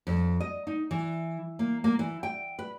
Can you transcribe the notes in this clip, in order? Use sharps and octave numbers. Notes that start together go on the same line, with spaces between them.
F2
D#5
D#4
E3
A#3
A#3
E3
G5
B4